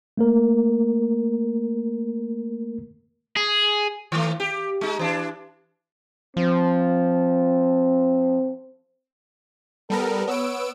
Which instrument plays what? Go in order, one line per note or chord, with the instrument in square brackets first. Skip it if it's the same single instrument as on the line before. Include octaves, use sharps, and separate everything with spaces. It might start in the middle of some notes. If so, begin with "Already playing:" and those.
[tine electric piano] A3 A#3 A#4
[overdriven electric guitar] G#4
[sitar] D#3 A3
G4
G#3 D#4
E3 D4
[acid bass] F3 [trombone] C4
[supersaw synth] G3 B3 A#4 [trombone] A4
[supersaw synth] B3 E6 D7 [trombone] C#5